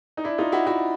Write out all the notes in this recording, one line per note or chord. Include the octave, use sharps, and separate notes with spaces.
D#4
D4 E4
D#4 F4
E4 F#4
E4 F#4